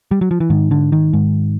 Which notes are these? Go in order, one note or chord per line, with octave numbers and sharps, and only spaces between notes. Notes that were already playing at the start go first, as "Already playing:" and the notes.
G3
F#3
F3
E3
G#2 D#3
D3
D#3
G#2